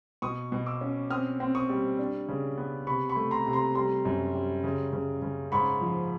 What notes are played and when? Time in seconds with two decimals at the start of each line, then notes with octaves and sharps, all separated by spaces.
0.22 B2 C#6 D#6
0.52 B2
0.66 D6 E6
0.81 C#4
1.10 C4 D#6 F6
1.40 C4
1.55 C#6 D#6
1.69 G3
1.99 D4
2.29 C#3
2.58 B3
2.87 C3 B5 C#6
3.09 B5 C#6
3.16 A3
3.31 A#5 C6
3.46 C3
3.53 A#5 C6
3.75 G3 A#5 C6
4.05 F#2
4.35 G3
4.64 C#3
4.93 C#3
5.22 C#3
5.52 G#2 B5 C#6
5.81 F3